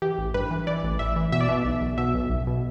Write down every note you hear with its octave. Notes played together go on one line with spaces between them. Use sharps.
E3 G4
A1
G2 B4
E3
E3 D5
A1
A1 E5
E3
B2 E5
D5
B2 E5
B1
B1
B2 E5
B1
B1
B2